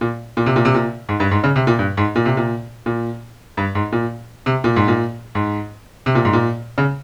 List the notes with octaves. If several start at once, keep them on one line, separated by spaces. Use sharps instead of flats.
A#2
A#2
C3
A#2
C3
A#2
G#2
G2
G#2
C#3
C3
A#2
G2
G#2
A#2
C3
A#2
A#2
G2
G#2
A#2
C3
A#2
G#2
A#2
G#2
C3
A#2
G#2
A#2
C#3